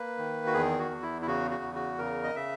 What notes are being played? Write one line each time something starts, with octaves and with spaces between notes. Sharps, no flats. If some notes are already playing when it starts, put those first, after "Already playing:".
Already playing: A#3 B4
D#3
F#4
E2 G#4
F#4
E2
E4
E4
C#3 F#4
F#4
E2
F#4
C#3 A#4
D#5
C#3 E5